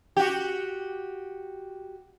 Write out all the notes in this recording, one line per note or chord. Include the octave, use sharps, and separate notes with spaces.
F#4 G4